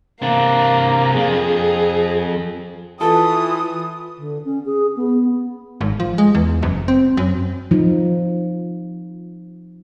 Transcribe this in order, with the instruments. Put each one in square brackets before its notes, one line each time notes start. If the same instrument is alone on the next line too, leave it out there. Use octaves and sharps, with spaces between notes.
[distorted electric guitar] C3 D4 [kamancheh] A#3
[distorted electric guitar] F2 [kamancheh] G#4
[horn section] E3 [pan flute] F4 [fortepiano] A4 [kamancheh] D#6
[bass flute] D3
C#4
G#4
B3
[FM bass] G#1
F3
G#3
E2
F#1
C4
F#2
[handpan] F3 D#4